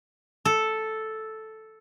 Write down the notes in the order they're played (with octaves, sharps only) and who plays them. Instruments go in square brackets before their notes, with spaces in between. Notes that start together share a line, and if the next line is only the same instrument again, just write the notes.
[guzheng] A4